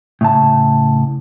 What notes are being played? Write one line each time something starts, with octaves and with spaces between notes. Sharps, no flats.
A2 C#3 A5